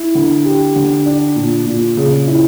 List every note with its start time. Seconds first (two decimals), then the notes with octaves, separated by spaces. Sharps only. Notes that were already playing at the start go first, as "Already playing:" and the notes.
Already playing: E4
0.15 D3
0.45 G4
0.76 D3
1.06 D4
1.36 A#2
1.66 A#2
1.97 C#3
2.27 E4